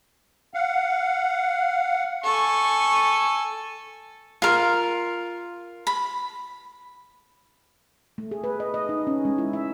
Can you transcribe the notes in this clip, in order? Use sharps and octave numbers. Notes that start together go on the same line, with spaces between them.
F5 F#5
A4 G#5 C#6
F4 A#4
B5
A3
G#4
B4
D#5
D#5
D#4
C#4
G#3
E4
E5